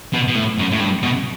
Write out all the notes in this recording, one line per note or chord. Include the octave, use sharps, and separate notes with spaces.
B2
B2
A2
F#2
A2
G2
B2